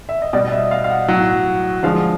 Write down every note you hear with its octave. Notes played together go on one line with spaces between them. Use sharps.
E5
D#5
B2 G3 D5
D#5
E5
F5
F5
F#5
A2 F#3
D3 F3 G#3 F5